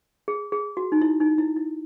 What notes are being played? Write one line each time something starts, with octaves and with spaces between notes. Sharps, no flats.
G#4
G#4
F#4
D#4
E4
D#4
E4
E4